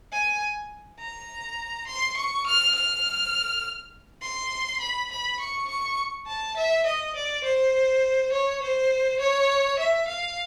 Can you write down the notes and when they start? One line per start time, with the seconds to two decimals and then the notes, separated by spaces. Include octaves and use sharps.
0.12 G#5
1.00 A#5
1.87 C6
2.17 C#6
2.46 F6
2.75 F6
4.22 C6
4.80 B5
5.11 B5
5.40 C#6
5.68 C#6
6.27 A5
6.57 E5
6.86 D#5
7.16 D5
7.44 C5
8.33 C#5
8.62 C5
9.20 C#5
9.79 E5
10.08 F5